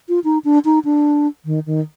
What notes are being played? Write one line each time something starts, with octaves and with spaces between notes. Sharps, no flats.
F4
D#4
D4
D#4
D4
D#3
D#3